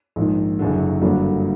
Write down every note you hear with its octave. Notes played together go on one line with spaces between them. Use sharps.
A#1 G#2 D#3
F#1 F#2 D3
G1 G2 D3 F#3 A#3